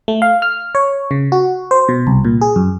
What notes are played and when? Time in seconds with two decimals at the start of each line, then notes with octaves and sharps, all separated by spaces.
0.08 A3
0.22 F5
0.42 F6
0.75 C#5
1.11 C#3
1.32 F#4
1.71 C5
1.89 B2
2.07 C2
2.25 A#2
2.41 G#4
2.56 F#2